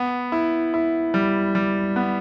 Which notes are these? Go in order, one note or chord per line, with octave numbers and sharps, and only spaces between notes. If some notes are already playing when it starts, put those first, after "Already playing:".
Already playing: B3
E4
E4
G3
G3
B3